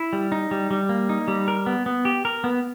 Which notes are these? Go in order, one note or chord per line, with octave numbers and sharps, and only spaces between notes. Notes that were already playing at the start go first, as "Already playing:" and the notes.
Already playing: E4
G3
D#4
G3
G3
A#3
D#4
G3
A#4
B3
B3
G4
A#4
B3